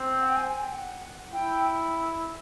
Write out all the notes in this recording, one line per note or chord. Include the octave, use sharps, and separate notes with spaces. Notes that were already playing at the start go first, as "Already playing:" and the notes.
Already playing: C4
F#5
G5
G#5
G#5
G5
F#5
E4 G5